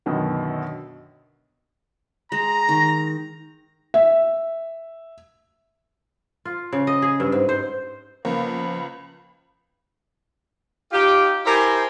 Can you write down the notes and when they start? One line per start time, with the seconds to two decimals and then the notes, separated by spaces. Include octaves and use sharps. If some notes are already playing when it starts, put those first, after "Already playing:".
0.06 F#2 B2 D3 D#3
2.32 G#3 A#5 A#6
2.69 D#3
3.94 E5
6.45 F4
6.73 C#3
6.87 D#5
7.02 G#4
7.20 G2
7.32 G#2
7.49 C5
8.25 C#2 F3 A#3 B3 B5
10.92 D#4 F4 G4
11.46 E4 G4 A#4 C5 G#5